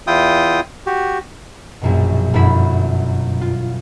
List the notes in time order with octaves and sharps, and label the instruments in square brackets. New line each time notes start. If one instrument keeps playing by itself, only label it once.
[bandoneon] E2 E4 F4 G5 D#6
F#4 G4
[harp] A#1 F#2 B2
G1 F#2 B2 E4 B5 E7
F4